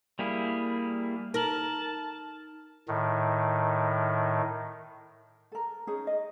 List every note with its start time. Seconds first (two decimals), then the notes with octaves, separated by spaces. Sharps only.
0.19 G3 A#3 E4 G#4
1.34 D#4 A#4 A5 F6 F#7
2.88 A2 D#3
5.52 A4 A#4
5.87 C#4 D#4 G#4
6.07 D#5